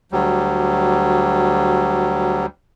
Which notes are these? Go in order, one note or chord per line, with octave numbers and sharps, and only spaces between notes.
D2 F#3 G3